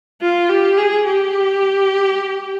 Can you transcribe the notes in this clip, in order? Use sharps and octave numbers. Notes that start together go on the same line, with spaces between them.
F4
G4
G#4
G4